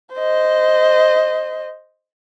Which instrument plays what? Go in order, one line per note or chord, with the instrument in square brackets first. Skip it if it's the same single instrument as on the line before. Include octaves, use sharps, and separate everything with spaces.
[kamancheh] C5 D#5